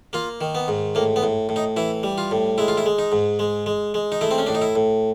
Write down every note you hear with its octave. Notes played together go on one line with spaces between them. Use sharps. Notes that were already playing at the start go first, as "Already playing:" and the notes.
A#3 F4
D#3
B3
G#2
A2 A#3
B3
A2
A2
D#4
E3 E4
G3
F4
A2
G#3 E4
F4
E4
G#3
D#4
G#2
G#3
G#3
G#3
D#4
A3 E4
C4
C#4
A2 D4
D#4
E4
A2